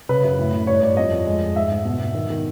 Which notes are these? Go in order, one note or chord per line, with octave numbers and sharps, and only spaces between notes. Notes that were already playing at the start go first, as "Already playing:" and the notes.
C#3 B4
F#2
A2
A2
G2 C#5
G3 D5
F2 D#5
F2
G#3
G#3
G#2 E5
G#2
B2
B2
D#3
D#3